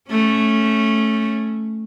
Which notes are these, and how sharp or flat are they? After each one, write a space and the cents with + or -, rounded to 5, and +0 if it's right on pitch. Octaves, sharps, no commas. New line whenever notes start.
A3 +0 C#4 +0